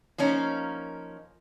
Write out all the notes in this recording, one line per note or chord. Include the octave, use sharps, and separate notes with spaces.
F3 A#3 C#4 D#4